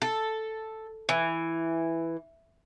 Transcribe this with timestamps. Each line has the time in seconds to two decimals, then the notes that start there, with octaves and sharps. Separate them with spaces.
0.02 A4
1.09 E3